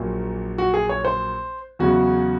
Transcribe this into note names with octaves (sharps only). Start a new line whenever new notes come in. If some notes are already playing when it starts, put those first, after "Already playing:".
Already playing: A#1 A#2 F#3 A#3
F#4
G#4
C#5
C5
E2 C#3 F#3 F#4